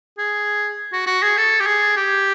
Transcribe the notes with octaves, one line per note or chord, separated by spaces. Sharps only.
G#4
F#4
F#4
G#4
A4
G4
G#4
G4